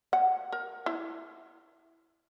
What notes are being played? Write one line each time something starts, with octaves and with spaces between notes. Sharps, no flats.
F#5
A#4
E4